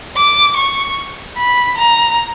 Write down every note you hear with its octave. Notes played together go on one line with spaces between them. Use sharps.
D6
C#6
B5
A#5